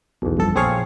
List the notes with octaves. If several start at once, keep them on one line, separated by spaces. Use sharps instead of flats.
B1 E2
G1 F2 A4
A#1 C4 G#4 C#5 F5